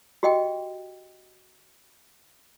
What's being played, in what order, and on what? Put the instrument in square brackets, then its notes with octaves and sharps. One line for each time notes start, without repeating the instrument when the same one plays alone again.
[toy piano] F#4 G4 D#5 F#5 G5